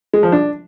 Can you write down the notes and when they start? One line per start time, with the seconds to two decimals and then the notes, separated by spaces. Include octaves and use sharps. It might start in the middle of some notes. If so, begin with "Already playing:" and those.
0.13 G#3
0.23 F3
0.32 D4